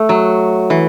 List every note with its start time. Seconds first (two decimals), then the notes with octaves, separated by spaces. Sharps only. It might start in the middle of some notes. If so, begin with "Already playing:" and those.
Already playing: A3
0.09 F#3
0.70 E3